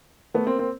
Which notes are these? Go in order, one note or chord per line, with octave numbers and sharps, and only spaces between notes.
A3 B3
A#3 C4
A#3 C4